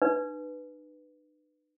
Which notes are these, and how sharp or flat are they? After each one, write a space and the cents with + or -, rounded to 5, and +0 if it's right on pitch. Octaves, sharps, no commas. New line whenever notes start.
D#4 -45 B4 +0